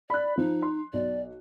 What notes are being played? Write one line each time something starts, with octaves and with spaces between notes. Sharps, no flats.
D5 B5 F#6
F3 D#4
C6
B1 D5